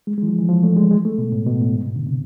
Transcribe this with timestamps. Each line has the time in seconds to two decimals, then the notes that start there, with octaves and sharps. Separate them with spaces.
0.07 G#3
0.18 G#3
0.23 E3
0.28 F3
0.39 E3
0.49 F3
0.63 A3
0.77 G#3
0.91 G#3
1.05 A3
1.18 B2
1.32 A2
1.47 B2
1.61 A2
1.75 G#2
1.86 B2
1.96 D3
2.07 C3